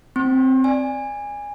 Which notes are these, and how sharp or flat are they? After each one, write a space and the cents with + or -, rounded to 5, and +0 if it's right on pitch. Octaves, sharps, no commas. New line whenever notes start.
C4 +0 C6 +45
D5 +0 G#5 -15